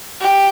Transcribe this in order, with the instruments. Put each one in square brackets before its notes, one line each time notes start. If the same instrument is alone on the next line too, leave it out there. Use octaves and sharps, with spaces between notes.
[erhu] G4